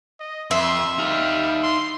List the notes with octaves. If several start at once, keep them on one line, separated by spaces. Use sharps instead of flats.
D#5
F2 E5 C6
G3 D#4 F5
C6